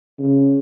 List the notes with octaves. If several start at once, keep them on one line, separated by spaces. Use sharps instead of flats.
C#3